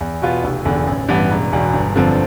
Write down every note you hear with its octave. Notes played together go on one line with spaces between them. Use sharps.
E2
B2 B3 F4
F1
E2 D3
A1
G2 E3 B3
E1
E2 B2
G1
F2 D3 F3 C4